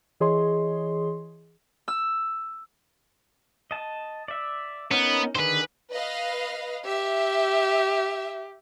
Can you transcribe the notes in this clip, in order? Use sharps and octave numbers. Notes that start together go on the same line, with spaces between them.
E3 G#4 C#5 D#5 C6
E6
D#5 A5
D5 E5
B3 C#4 D#4 A#4
D3 D#3 G#4 B4 C5
B4 D#5 F5
G4 E5